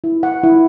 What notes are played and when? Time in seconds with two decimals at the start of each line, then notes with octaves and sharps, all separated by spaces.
0.04 E4
0.23 F#5
0.43 E4